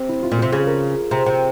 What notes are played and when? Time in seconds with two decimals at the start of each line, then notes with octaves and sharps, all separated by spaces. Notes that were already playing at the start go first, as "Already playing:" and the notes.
Already playing: C3
0.09 E4
0.23 F4
0.32 A#2
0.38 C3 G4
0.52 C#3 G#4
0.67 A#4
1.11 C3 A#5
1.26 C3 G5